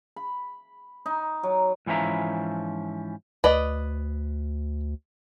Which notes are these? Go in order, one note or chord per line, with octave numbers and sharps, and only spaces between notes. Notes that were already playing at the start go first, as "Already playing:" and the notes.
B5
D#4
F#3
G#2 E3 F3 C#4 E5 A#5
D2 B4 D5 D#5